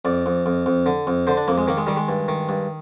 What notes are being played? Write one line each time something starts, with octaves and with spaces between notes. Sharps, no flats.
F2 D5
F2
F2
F2
D3
F2
D3 C5
D4
F2 A#3
G#3
D#3 A#3
G#3
D#3 G3
G#3
G2
D#3
G2